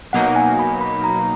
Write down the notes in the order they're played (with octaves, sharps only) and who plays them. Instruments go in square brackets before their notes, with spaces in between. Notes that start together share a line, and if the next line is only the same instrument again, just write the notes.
[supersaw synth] B2 F#3 A#3 D#4 [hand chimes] F#5
[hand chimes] G#5
B5
B5
A#5